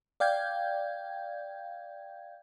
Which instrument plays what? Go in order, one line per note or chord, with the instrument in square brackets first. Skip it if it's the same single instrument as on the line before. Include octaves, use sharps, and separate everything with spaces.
[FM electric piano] D5 F5 G5 G6 G#6